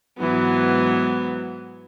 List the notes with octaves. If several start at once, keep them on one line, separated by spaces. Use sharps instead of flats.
G#2 E3 F#3 B3